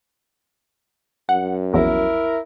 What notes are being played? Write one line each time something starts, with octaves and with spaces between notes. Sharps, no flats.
F#2 F#5
A#1 E2 E4 A#4